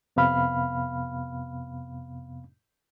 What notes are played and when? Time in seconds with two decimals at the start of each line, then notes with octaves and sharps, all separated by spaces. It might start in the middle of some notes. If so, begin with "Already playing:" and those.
0.16 F2 C3 B3 F5 B5 F6